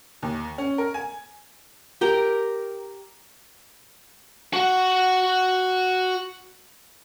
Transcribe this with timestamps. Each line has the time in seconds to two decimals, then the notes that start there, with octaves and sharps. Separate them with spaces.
0.23 D#2
0.58 C#4
0.78 A#4
0.94 G#5
2.01 G4 A#4 G5 A#5
4.53 F#4 F#5